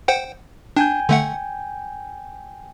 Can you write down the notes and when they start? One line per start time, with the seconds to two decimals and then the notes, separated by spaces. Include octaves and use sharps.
0.08 C5 F#5 G5
0.76 D4 G5 G#5 G6
1.09 D3 A3 F#5